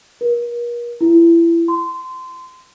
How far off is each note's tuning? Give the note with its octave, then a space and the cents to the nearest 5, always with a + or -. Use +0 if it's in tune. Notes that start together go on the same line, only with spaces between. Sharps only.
A#4 +40
E4 +30
C6 -20